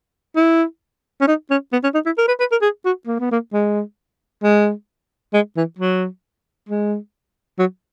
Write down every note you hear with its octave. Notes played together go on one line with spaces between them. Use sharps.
E4
C#4
D#4
C#4
B3
C#4
D#4
E4
A#4
B4
B4
A#4
G#4
F#4
A#3
B3
A#3
G#3
G#3
G#3
E3
F#3
G#3
F#3